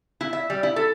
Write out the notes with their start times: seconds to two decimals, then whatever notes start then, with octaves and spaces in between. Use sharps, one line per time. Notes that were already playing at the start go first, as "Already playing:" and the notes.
0.21 E4
0.33 E5
0.50 G3
0.63 E4
0.76 A4